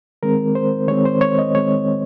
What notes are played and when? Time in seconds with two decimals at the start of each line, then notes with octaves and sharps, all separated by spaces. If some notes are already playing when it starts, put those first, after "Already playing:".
0.23 D#3 G#3 C4 A#4
0.55 C5
0.88 D#3 G#3 C4 C#5
1.05 C5
1.21 C#5
1.38 D#5
1.55 D#3 G#3 C4 C#5